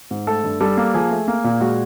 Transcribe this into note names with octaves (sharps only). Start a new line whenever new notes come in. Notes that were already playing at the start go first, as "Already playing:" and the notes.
G#2
A3 A4
G2
G3 A4
A#3
F3 G#4
A3
A#3
A#2
G#3 F#4